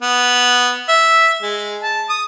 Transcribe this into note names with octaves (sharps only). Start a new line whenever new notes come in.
B3
E5
G#3
A5
D#6